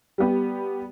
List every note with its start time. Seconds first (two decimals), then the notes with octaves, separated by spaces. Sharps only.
0.18 G3 B3 G4